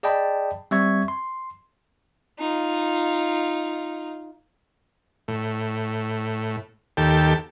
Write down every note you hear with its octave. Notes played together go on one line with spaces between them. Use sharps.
G#4 D5 D#5 G5 A5 B5
G3 C4 E5 C#6 G#6
C6
D#4 F4
A2
D#2 G4 A4